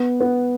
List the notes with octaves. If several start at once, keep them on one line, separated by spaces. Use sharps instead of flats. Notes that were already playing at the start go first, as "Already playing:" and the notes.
Already playing: B3
B3